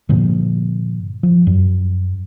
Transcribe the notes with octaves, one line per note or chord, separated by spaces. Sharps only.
G2 A#2 D3 F3
F3
F#2